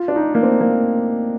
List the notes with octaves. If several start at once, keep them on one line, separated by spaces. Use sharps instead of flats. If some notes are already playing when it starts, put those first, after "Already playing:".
Already playing: F4
D4
D#4
A#3
C4
A#3